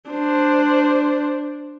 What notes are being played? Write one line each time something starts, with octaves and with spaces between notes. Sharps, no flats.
D4 C5